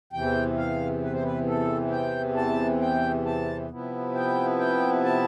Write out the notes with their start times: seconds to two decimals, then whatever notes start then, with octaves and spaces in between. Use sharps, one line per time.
0.13 E2 C3 E3 G5
0.57 F5
1.02 B4
1.13 C5
1.22 B4
1.46 A4
1.91 G5
2.36 A5
2.81 G5
3.26 A5
3.70 C3 F3 B3 E4
4.15 G5
4.59 G5
5.04 A5